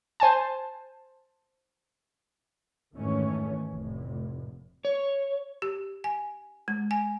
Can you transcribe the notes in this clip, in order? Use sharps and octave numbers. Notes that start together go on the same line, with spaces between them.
C5 G#5 A5
F2 G#2 D#3 E3 A3 C#4
F1 A2
C#5
G4
G#5
G#3
G#5